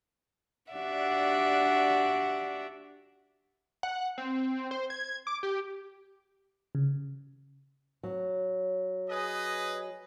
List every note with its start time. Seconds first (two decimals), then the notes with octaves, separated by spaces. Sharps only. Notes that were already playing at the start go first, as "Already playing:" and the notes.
0.72 D4 F#4 G4 D5 E5 F#5
3.83 F#5
4.18 C4
4.71 C5
4.90 G#6
5.27 D6
5.43 G4
6.75 C#3
8.03 F#3
9.09 G#4 B4 D#5